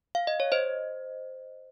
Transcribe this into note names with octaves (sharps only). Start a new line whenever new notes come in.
F5
D#5
C#5
C5 D#5